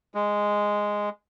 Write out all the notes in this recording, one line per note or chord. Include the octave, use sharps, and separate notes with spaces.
G#3